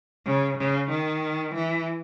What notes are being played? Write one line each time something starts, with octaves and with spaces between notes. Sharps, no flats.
C#3
C#3
D#3
E3